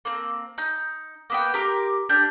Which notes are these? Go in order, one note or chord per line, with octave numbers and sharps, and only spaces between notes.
A#3 C4
D#4 G6
A#3 B3 G5
G4 A#4 C6 D6
D4 G4 F6 G6